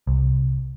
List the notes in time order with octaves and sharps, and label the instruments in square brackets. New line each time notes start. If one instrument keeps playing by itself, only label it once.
[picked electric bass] C2